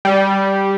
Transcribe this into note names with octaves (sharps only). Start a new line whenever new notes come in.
G3